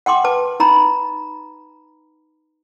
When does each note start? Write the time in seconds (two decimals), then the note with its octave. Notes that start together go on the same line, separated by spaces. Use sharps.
0.06 F#5 G5 C6 D6
0.24 B4 A5 D6
0.60 D#4 A#5 B5